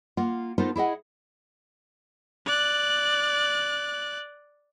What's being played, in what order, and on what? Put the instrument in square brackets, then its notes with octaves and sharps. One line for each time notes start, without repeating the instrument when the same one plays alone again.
[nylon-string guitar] A#3 F4 F#5
B3 D#4 F4 A4 A#4 C5
E4 G#4 D#5 F#5
[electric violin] D5 F#6